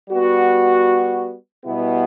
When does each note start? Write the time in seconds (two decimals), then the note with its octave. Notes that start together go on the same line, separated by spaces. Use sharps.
0.10 G3 B3 F#4
1.66 B2 G3 B3 E4 G4